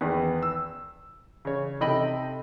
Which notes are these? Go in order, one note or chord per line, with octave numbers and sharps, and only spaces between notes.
E2 D#3 B3
E6
C#3 C#5
C3 D#4 A4 D#5 G5 B5